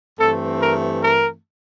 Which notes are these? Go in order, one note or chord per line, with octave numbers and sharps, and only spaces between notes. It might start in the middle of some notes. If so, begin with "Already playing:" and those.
G2 E3 A3 C4 A4
A#4
A#4